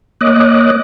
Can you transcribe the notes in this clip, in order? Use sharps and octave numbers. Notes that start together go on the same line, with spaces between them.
A#3 C#5 D#5 D6 D#6 F#6